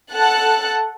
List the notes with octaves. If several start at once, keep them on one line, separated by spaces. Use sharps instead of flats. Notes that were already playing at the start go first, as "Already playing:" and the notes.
A4 F#5 A5 F#6